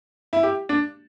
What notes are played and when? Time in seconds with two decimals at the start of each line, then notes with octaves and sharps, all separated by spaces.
0.33 E4
0.43 G4
0.69 D4